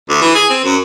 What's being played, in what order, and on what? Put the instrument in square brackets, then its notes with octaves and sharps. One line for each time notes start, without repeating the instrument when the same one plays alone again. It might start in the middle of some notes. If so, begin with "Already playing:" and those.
[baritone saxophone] D2
E3
G#4
C4
F#2